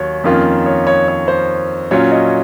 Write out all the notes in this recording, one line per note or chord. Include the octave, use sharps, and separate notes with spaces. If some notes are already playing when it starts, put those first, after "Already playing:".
Already playing: D#2 F#3 C#5
F2 D#3 A#3 C#4 F4
C#5
C#5
C#5
C5
A#2 F#3 C#4 F4 C#5
D#5